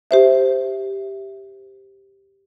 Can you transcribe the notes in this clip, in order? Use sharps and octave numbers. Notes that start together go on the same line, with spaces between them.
G4 C5 E5